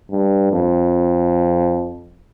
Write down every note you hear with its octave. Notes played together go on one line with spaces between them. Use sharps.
G2
F2